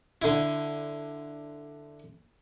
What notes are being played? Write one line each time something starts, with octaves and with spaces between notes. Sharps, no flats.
D3 E4